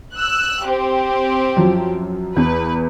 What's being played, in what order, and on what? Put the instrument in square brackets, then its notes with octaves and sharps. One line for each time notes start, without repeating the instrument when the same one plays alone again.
[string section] E6 F#6
C4 G4
[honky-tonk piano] F#2 F3 F#3
[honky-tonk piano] E2 [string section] B4